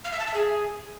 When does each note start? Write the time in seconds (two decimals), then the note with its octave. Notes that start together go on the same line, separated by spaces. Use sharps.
0.05 F5
0.12 E5
0.19 A5
0.27 E5
0.34 G#4